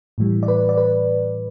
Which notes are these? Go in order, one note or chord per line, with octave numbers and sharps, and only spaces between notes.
A2 E3 G3
D5
B4
D5
B4